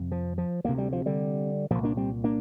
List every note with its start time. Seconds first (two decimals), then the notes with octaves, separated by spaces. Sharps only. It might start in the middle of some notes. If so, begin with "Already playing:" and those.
Already playing: F2 C3
0.12 F3
0.38 F3
0.64 D2 C3 A#3
0.78 G3
0.92 F3
1.06 D3 G3
1.71 C2 A#2 F3 A#3
1.83 A#3 D4
1.97 G3 C4
2.24 A#3 D4